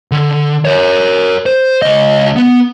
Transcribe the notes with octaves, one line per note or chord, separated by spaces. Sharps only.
D3
A#4 C#5
C5
C#2 D#5
B3